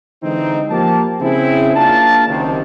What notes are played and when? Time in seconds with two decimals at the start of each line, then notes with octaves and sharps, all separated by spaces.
0.23 D3 E3 G#3 C4 D#4
0.70 F3 A#3 G4 A5
1.19 C#3 C4 E4 G#4
1.76 A#3 D4 F4 A#4 F5 A5
2.27 F#1 C3 D#3